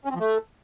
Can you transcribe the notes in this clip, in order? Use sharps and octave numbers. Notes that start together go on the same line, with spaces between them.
C#4
C4
F3
A3